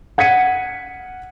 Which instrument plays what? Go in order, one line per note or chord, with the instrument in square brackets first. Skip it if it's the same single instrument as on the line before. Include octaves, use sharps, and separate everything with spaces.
[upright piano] F#5 G#6 B6 C#7 D#7